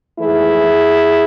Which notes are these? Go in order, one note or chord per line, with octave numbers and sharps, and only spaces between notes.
G#2 E3 A3 E4 G#4